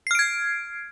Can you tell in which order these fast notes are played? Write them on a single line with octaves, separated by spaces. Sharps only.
C7 F6 D7 G#6